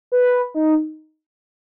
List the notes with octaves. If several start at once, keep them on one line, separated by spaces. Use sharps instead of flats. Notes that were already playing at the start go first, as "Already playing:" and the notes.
B4
D#4